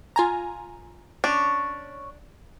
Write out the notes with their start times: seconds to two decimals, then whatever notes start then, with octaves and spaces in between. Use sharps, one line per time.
0.16 F4 G#5 A#5
1.24 C#4 D4 C#5